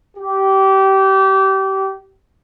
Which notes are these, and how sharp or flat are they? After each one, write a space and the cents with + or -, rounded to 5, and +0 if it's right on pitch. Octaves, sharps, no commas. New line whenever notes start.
G4 -25